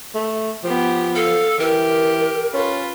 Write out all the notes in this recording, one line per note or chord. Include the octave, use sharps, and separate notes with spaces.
A3
F3 B3 G4
A4 F5
E3 G4 A#4
C#4 F4 B4